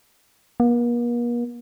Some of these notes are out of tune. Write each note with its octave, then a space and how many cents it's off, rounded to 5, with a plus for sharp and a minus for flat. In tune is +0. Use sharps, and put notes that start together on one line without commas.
A#3 +45